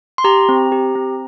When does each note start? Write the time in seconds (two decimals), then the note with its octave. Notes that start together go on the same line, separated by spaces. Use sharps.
0.18 C6
0.24 G4 A#5
0.49 C4
0.72 G4
0.95 C4